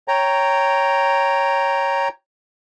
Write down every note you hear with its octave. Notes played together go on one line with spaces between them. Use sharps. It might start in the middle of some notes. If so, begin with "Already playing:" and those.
C#5 G5 A#5